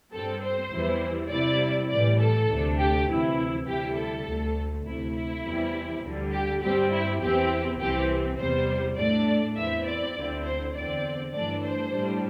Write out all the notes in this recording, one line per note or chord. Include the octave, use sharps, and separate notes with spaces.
G2 G3 C4 A4
C5
E2 E3 G3 E4
C3 G3 E4 D5
A2 E3 G3 D5
A4
D2 C3 A3 D4
G4
D2 C3 E3 E4
D2 C3 G3 E4 G4
A4
D2 D3 A3
D2 C3 A3 E4
E4
E2 E3 G3 C4
D2 D3 G3
G4
G2 G3 C4 G4
E4
E2 E3 C4 E4 G4
C2 C3 E3 C4 G4
E2 C3 G3 C5
A2 A3 D4 D5
E2 E3 C4 E4 E5
D5
D2 D3 C4 E4
C5
E2 D3 C4 D5
G2 E3 A3 D4 D5
C5
A2 G3 D4